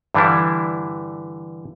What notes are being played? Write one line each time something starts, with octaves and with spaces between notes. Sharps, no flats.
G2 D3 E3 G3 D4 E4